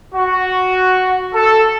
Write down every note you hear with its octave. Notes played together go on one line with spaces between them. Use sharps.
F#4
A4